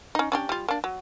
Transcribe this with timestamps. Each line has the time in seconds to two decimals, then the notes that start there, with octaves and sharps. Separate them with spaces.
0.15 C#4 D#4
0.32 C#4 D4 G4
0.49 G3 F4
0.68 A#3 D4
0.84 F#3